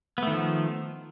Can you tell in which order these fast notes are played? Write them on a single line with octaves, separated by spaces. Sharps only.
B3 A3 D#3 F3